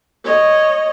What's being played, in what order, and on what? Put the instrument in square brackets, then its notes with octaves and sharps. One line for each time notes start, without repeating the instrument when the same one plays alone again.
[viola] C#5 D#5